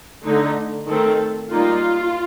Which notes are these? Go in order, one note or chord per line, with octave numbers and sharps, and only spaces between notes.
D3 A3 D#4
D#3 A3 C4 A4
G3 A#3 D#4 F4